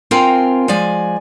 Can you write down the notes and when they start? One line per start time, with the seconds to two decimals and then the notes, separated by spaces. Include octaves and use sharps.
0.11 C4 F4 A#4 F5 G5 G#5
0.68 F3 G#3 D5 G#5